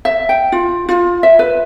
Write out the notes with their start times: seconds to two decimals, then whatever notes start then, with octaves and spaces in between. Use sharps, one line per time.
0.05 E5
0.29 G5
0.52 F4
0.89 F4
1.23 E5
1.39 B4